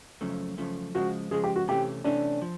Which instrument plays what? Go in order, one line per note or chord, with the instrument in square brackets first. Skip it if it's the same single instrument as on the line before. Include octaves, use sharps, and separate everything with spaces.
[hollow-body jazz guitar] F#2 C#3 F3 A3
F#2 C#3 F3 A3
[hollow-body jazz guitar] C#3 F3 G#3 [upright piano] F#4
[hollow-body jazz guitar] C#3 F3 G#3 [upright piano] G#4
[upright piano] G4
F#4
[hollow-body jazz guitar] C3 E3 A3 C#4 [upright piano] G4
[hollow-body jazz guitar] C3 E3 A3 C#4 [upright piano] D4
[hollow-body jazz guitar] F3